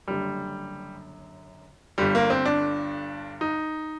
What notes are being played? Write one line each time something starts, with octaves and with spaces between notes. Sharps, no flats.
F#1 F#2 D3 G3
G1 G2 D3 G3
A#3
C4
D4
D#4